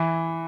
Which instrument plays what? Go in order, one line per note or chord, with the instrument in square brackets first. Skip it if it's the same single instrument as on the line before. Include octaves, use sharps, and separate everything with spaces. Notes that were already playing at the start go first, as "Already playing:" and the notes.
Already playing: [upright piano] E3